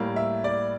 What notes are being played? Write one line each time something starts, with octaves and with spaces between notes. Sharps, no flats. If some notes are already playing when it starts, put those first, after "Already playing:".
Already playing: A2 G3 A#3
E5
D5